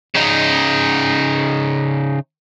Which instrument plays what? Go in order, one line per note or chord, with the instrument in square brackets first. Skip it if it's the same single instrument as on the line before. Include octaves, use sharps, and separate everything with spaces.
[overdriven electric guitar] C#3 D#4